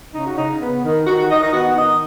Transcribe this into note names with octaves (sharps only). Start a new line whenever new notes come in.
C#3 D#4
F#4
C#3 D#4
B3
D#3
D#3 F#4
F#4
D#3 D#4 D#5
D#4 D#5
B3 F#4 F#5
D#3 D#4 D#5